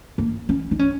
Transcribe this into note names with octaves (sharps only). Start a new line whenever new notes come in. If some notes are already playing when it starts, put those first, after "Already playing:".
A#3
C#4
D#4
C#4